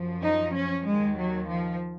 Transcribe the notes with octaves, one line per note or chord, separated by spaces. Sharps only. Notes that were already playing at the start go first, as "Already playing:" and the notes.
Already playing: F#2 F3
D#4
C#4
D#2 D#3 G#3
F#3
F3